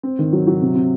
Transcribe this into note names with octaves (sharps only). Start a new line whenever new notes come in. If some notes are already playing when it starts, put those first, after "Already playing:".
C4
D#3
F#3
F#3
C3
C3